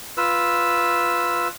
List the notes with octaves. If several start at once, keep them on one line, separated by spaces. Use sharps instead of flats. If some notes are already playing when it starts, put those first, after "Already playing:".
F4 B4 E6